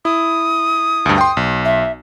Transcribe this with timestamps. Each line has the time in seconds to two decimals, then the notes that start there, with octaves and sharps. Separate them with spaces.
0.05 E4 D#6
1.06 D2 G2
1.18 G5 C6
1.37 B1
1.65 E5